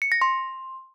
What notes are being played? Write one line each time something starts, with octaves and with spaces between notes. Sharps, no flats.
C#7
A#6
C6